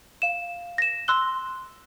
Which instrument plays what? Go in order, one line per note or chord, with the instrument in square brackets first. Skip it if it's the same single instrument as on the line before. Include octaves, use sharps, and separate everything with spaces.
[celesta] F5 E7
A#6 E7
C6 E6 F#6 G7